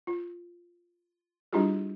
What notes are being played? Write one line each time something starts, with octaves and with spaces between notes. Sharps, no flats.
F4
G3 D4 E4 F4 G4 G#4